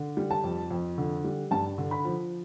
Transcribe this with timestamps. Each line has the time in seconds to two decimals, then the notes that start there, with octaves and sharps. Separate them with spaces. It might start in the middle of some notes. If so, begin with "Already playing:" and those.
Already playing: D3
0.17 G3
0.31 A5
0.44 F2
0.70 F2
0.98 D3
1.24 G3
1.51 G2 A5
1.78 D3
1.91 B5
2.05 F3